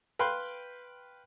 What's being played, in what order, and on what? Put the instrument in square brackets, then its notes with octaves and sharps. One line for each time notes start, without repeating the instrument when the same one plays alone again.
[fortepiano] B4 F5 G5 B5 C6